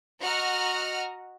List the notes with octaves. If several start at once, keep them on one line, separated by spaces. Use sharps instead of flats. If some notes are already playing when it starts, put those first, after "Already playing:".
F#4 D#5 F#5 A#5 F6